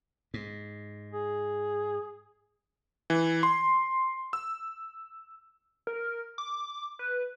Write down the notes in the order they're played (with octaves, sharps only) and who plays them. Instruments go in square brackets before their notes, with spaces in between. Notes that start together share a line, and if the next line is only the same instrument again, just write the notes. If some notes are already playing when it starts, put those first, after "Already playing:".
[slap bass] G#2
[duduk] G#4
[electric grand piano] E3
C6
E6
[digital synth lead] A#4
D6
B4